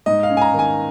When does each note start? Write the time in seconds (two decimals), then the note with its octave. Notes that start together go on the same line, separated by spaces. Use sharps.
0.06 G#2 D#5
0.23 F5
0.30 C#4
0.37 G#5
0.41 A#5
0.53 D#3
0.59 G#5